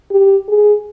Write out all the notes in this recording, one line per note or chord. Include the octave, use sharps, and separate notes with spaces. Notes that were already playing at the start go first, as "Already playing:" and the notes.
G4
G#4